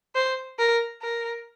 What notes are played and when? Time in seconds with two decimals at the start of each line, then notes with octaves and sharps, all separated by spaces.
0.15 C5
0.59 A#4
1.02 A#4